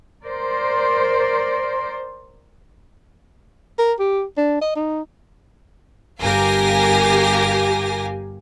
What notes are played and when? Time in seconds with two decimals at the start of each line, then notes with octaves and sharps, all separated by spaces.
0.24 A#4 C5 D5
3.78 A#4
3.99 G4
4.37 D4
4.61 D#5
4.76 D#4
6.22 G1 G4 A#4 F5 G#5 A#6